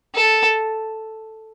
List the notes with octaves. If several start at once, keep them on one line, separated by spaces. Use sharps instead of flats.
A4